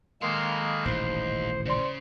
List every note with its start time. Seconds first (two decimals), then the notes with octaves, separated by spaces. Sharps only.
0.22 D#3 G#3 A#3 A4 F5 C6
0.51 B5
0.85 D#1 A1 D#2 G#2 C5
1.66 C#3 C5 D5 C6